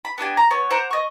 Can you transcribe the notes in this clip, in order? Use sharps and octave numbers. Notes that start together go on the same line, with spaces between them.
B5
B3 D4 G4 G#5
A#5
B3 C#5
C5 F#5 A#5 D6
D#5 C#6